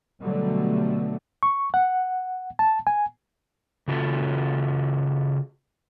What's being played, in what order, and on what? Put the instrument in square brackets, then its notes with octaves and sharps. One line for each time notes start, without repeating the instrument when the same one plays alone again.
[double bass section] B2 D3 F#3 G3 A3
[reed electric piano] C#6
F#5
A5
G#5
[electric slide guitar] C#3 F4 F#4 A4